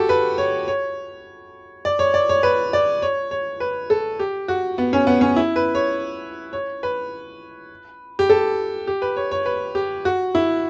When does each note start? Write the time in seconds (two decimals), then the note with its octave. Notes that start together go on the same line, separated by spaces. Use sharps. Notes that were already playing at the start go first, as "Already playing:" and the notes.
Already playing: F#4 G4 A4
0.09 B4
0.38 C#5
0.68 C#5
1.85 D5
1.99 C#5
2.14 D5
2.29 C#5
2.43 B4
2.73 D5
3.02 C#5
3.31 C#5
3.60 B4
3.90 A4
4.19 G4
4.48 F#4
4.78 B3
4.93 C#4
5.07 B3
5.21 C#4
5.36 E4
5.56 B4
5.75 C#5
6.53 C#5
6.83 B4
8.19 G4
8.30 A4
8.87 G4
9.02 B4
9.17 C#5
9.31 C#5
9.46 B4
9.75 G4
10.05 F#4
10.35 E4